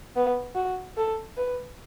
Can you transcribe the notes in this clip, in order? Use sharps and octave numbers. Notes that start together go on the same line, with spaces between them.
B3
F#4
A4
B4